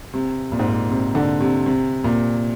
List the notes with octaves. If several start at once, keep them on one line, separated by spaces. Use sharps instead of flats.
C3
A#2
G#2
A#2
C3
D3
C3
C3
A#2